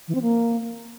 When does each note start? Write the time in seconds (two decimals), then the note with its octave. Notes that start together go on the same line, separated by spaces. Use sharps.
0.08 E3
0.15 C4
0.22 A#3